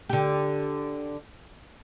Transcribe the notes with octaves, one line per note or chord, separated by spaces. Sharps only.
D3 G4